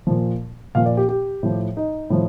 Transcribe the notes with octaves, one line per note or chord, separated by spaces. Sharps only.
A#2 F3
A#2 F3 F5
D5
G4
G4
A2 F3
D#4
A2 F3